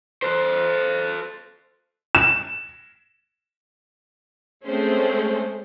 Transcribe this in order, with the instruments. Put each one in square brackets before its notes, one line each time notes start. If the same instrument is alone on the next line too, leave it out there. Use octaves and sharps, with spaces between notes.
[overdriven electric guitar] A4 C5
[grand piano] E7
[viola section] G#3 A3 C4 C#4 C5